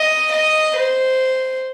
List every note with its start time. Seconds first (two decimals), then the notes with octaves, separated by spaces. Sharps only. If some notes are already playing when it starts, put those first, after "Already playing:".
Already playing: D#5
0.31 D#5
0.76 C5